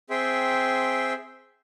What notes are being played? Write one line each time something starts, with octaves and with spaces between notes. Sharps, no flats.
C4 G#4 E5 G5 C6